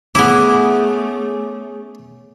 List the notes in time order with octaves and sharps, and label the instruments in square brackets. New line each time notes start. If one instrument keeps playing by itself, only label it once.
[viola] A3 [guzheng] B3 E4 [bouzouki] C#4 G#4 [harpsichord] D6